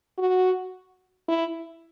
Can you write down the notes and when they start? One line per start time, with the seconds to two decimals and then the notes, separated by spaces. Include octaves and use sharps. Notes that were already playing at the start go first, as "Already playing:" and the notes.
0.18 F#4
1.28 E4